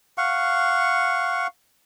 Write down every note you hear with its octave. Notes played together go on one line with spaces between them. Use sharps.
F5 F#5 C#6